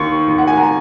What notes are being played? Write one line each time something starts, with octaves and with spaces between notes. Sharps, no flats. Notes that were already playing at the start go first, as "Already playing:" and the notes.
Already playing: D#2 C#6
D#2
F#5
G#5
A#5